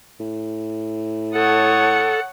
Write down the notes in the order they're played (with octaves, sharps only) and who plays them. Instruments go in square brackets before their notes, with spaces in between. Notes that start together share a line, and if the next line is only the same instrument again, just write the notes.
[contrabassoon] A2
[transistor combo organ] A4 [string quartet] C#5 A5 D#6 [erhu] F#5